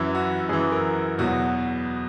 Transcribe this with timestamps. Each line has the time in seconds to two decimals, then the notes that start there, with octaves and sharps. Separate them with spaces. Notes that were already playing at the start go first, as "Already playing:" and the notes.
Already playing: F#2 E3 E4
0.15 F#4
0.49 F#2 E3 G#4
0.72 A#4
1.18 E2 B2 F#3 F#4